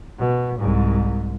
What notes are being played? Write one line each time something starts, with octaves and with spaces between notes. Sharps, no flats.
B2
C2 G#2